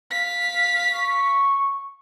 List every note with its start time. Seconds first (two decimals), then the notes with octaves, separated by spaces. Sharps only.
0.11 F5 B6
0.93 C#6